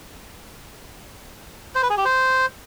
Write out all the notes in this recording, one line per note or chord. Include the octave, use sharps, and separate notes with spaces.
C5
B4
G#4
G4
C5